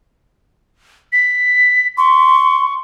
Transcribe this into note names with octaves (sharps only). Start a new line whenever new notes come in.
B6
C6 C#6